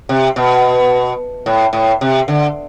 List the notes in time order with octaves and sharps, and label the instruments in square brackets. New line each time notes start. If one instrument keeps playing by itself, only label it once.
[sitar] C3
B2
A2
A2
C3
D3